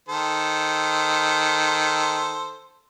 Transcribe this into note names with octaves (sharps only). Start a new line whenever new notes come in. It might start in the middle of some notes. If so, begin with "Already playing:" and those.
D#3 A4 C5